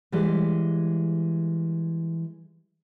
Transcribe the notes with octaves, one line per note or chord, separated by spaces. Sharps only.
E3 G3 G#3